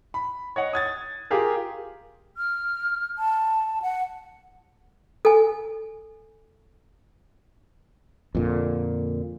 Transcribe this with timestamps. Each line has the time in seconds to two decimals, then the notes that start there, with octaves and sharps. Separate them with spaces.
0.14 B5
0.56 C#5 D#5 F#5
0.73 D#6 G#6 A6
1.31 F4 G4 G#4 A#4
2.37 F6
3.18 A5
3.82 F#5
5.25 A4 G#5
8.35 F2 A#2 D3